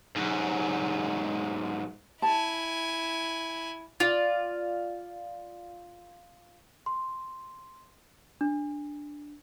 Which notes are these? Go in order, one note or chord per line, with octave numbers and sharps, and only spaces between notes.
G#2 F#3
E4 G#5 A5
F4 D5
C6
D4